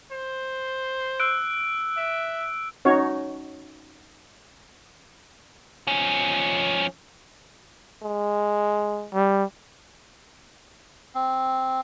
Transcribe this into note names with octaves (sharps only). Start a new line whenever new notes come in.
C5
E6 F#6 D7
E5
C#4 D#4 F#4 C#5
F3 C#4
G#3
G3
C4